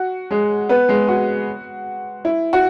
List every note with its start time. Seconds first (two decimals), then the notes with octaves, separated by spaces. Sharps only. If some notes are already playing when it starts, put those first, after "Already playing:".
Already playing: F#4
0.31 G#3 G#4
0.69 B3 B4
0.88 G#3 G#4
1.08 F#4
2.25 E4
2.53 F#4